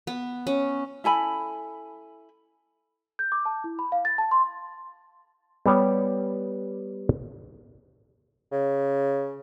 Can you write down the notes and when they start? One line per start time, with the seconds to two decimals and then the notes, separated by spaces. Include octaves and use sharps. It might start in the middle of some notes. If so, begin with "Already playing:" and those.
0.07 B3
0.47 C#4
1.04 E4 A4 G#5 B5
3.19 G6
3.32 D6
3.46 A5
3.64 E4
3.79 B5
3.92 F5
4.05 A6
4.18 A5
4.31 C6
5.66 G3 B3 G4 C#5
8.52 C#3